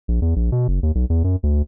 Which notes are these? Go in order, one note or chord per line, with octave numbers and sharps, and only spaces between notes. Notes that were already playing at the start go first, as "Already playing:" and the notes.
A#1
E2
A#1
B2
F#1
D#2
B1
E2
F#2
D2